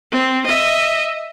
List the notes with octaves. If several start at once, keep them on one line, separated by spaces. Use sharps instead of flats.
C4
D#5 E5